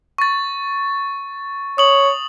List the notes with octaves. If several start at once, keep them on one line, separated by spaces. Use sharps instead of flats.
C#6 A6
C#5 D#6 F#7